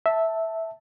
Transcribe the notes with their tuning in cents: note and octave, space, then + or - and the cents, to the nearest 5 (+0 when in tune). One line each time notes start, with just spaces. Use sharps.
E5 -10 A5 +5